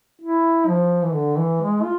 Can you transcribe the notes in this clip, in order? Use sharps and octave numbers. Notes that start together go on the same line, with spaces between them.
E4
F3
E3
D3
E3
G#3
F4